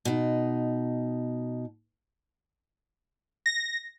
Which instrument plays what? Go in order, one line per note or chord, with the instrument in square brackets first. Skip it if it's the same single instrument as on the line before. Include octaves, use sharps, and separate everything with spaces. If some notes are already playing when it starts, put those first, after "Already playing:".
[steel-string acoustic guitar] B2 D#4
[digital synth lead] A#6